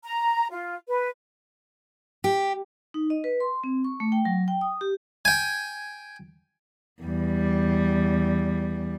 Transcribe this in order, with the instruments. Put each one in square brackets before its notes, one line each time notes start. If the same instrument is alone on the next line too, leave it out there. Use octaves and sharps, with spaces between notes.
[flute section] A#5
F4
B4
[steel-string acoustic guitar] G4
[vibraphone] D#4
D#5
B4
C6
C4
C#6
A3
G5
F#3
G5
D#6
G4
[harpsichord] G5 G#5
[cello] E2 G3